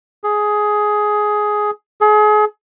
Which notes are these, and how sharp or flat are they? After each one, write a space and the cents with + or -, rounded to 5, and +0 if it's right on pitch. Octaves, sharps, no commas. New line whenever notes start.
G#4 +10
G#4 +35